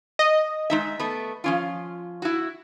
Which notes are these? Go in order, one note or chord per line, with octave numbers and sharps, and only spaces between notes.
D#5
G#3 D#4 E5
A3 B3
F3 C#4 F4
E4 F#4